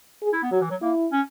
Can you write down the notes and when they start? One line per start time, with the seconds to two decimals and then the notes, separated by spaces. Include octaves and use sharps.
0.23 G#4
0.33 E4
0.43 B3
0.52 F#3 F#4
0.61 E3
0.70 F#3
0.82 A#3 E4
1.12 C#4